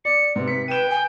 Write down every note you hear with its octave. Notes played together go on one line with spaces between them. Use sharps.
D5 C#7
G#2 C3 B4
C3 B6 C#7
B4 G5 D#7 E7
G#5